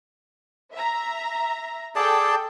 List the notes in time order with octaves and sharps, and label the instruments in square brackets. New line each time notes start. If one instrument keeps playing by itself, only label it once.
[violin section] E5 A#5
[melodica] G#4 D5 A5 [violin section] A4 G5